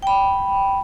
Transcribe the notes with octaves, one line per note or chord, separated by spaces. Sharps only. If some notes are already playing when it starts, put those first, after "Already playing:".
G5 B5